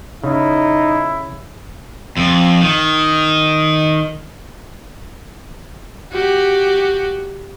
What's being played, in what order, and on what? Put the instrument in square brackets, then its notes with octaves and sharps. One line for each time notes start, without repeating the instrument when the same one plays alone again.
[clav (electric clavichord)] C#3 [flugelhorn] D#4 [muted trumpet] E4
[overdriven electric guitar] F2
D#3
[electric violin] F#4 G4